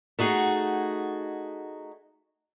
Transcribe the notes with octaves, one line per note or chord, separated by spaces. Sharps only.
A3 D#4 F#4 G#4